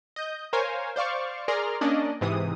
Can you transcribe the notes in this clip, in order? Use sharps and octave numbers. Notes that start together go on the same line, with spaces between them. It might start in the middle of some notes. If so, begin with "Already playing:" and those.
D#5 G6
A#4 C5 C#5 F5 G#5
C5 D5 F5 C#6
G#4 A#4 D5 A#5 C6 F6
A#3 C#4 D4 D5 D#5
G#2 C3 E3 D#6